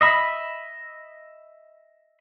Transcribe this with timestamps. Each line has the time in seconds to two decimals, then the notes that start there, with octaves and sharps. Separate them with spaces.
0.01 D#5 E5 B5